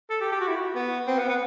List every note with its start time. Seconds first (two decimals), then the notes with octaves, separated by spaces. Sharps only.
0.10 A4
0.21 G4
0.32 G4
0.40 F#4
0.48 E4
0.56 F#4
0.75 B3
1.08 C4
1.19 B3
1.29 B3